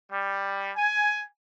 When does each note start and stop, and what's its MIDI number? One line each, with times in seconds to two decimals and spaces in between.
0.10 0.70 55
0.76 1.24 80